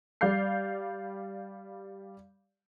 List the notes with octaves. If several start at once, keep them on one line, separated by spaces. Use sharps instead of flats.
G3 D5 F5 G6 C7